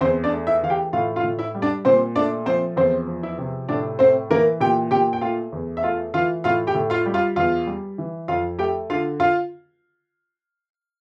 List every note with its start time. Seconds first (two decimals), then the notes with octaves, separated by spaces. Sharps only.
0.01 E2 C4 C5
0.24 D4 D5
0.32 A3
0.47 E4 E5
0.63 E3 F5
0.70 G4 G5
0.93 A2 F4 F5
1.16 F4 F5
1.23 A2
1.39 E4 E5
1.55 G3
1.62 D4 D5
1.85 A#2 C4 C5
2.16 A3 D4 D5
2.46 F3 C4 C5
2.76 E2 C4 C5
3.07 F3
3.23 E4 E5
3.38 C3
3.69 A2 D4 D5
3.99 A3 C4 C5
4.31 E3 A#3 A#4
4.60 A#2 G4 G5
4.91 A#2 G4 G5
5.13 G5
5.21 A3 F4 F5
5.52 E2
5.77 E5
5.83 A3 F4 F5
6.14 E3 F4 F5
6.44 A2 F4 F5
6.67 G4 G5
6.75 A2
6.90 F4 F5
7.06 G3
7.14 F4 F5
7.36 E2 F4 F5
7.67 G3
7.98 E3
8.28 F2 F4 F5
8.59 A3 G4 G5
8.90 D3 F4 F5
9.20 F4 F5